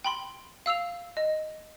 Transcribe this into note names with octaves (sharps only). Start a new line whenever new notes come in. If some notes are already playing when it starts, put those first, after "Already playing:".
G5 B5 C6
F5 E6 C7 F7
D#5